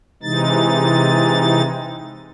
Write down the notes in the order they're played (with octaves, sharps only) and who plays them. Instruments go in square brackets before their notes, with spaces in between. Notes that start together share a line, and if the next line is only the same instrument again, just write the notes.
[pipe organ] C3 E3 G#3 D#4 A6